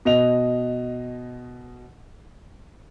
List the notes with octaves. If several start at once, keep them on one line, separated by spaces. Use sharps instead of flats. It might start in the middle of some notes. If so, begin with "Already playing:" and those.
B2 D#5 F7